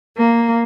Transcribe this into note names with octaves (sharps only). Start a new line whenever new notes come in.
A#3